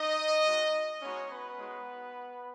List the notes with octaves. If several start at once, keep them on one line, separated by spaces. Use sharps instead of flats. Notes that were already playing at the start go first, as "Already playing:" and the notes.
Already playing: D#4 D#5
G#3 D#4 F#4
G#3 B3 C#4 D#4 F#4 C#5
B3 B4
G#3 D#4 F#4